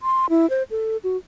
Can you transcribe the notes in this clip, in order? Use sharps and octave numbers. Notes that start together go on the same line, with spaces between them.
C6
E4
C5
A4
F#4